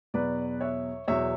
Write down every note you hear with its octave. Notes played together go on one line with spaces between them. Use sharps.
E2 B2 F#3 B4 D5
C#5 E5
E2 B2 F#3 C#5 E5